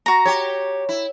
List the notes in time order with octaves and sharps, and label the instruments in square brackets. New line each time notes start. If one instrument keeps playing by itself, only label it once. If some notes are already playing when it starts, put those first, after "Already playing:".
[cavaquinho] F#4 A#5
[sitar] G4 C#5
E4